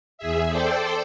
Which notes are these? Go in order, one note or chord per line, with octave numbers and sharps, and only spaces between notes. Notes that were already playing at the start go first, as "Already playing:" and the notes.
E2 G#4 E5
A4 C5 D5 G5